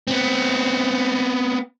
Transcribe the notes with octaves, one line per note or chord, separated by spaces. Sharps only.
B3 C4